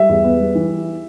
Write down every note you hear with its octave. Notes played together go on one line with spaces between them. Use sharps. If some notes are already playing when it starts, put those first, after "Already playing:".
Already playing: G3 E5
E2
B3
G3
E3